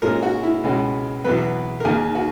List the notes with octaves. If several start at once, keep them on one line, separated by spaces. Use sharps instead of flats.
A#2 G#3 C#4 A#4
F#4
E4
C#2 B2 G#3 C#4
E2 B2 F#3 B3 B4
A#4
D#2 D#3 A#3 G#4
F#4